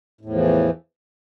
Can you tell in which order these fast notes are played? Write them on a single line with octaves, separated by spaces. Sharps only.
A2 E2 F3 E3